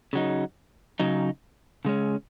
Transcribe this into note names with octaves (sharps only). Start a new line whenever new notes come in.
C#3 F#3 D#4
C#3 F#3 D#4
C#3 G#3 C#4